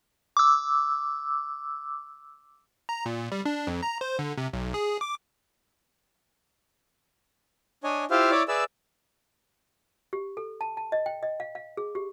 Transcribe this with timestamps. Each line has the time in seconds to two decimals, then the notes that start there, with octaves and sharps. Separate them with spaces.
0.37 D6 E6
2.89 A#5
3.06 A#2
3.32 G3
3.46 D4
3.67 F2
3.83 A#5
4.01 C5
4.19 D3
4.37 C3
4.53 B1
4.74 G#4
5.01 D6
7.84 D4 C#5 D#5 G#5
8.11 E4 F4 G4 C5 E5 F5
8.31 E4 C#5 D5 E5 D6
8.48 G#4 B4 D5 E5 E6
10.13 G4
10.37 A4
10.61 A5
10.77 A5
10.92 D#5
11.06 G5
11.23 D#5
11.40 F5
11.55 F5
11.77 G#4
11.95 G4